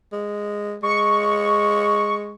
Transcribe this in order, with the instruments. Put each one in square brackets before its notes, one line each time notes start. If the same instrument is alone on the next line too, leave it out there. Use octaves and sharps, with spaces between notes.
[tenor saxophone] G#3
[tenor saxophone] G#3 [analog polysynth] C#6